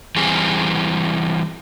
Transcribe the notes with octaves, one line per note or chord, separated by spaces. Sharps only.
E3 G3 C4 G#4